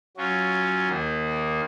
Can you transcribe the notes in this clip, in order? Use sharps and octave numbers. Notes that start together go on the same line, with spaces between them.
F#3 C#4 F4
D#2 D#3 A#3